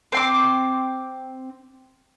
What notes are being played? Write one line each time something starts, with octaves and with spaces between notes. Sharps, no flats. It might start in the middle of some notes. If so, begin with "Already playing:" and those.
C4 C6 D6